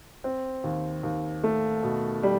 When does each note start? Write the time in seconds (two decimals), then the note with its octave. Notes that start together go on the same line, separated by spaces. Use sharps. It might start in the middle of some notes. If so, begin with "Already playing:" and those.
0.24 C4
0.64 D#2
1.03 D#2
1.43 A3
1.83 B2
2.23 G3